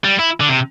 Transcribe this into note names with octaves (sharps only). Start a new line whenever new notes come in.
G3
E4
D3
C3